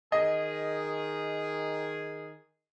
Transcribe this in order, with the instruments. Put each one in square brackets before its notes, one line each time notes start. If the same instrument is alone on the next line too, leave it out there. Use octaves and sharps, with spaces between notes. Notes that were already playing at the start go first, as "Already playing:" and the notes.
[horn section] D#3 G#4 [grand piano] D#5